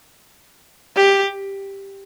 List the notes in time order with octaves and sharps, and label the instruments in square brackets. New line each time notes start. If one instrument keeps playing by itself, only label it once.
[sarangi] G4